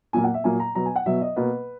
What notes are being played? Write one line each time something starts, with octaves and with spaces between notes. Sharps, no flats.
A#2 F#3 A#3 G#5
F#5
E5
A#2 F#3 A#3 G#5
A#5
B2 F#3 B3 A#5
G#5
F#5
B2 F#3 B3 E5
D#5
B2 A#3 B4